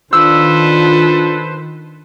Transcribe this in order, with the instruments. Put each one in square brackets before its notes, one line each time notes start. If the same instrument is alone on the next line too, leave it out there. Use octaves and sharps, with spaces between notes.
[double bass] D#3 [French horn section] D4 F4 [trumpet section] A4 B4 C5 [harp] E6